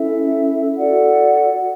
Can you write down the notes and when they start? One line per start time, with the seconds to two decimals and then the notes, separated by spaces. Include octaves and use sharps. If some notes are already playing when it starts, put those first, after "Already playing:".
Already playing: C#4 E4 A4 E5
0.78 F#4 A4 D5 F#5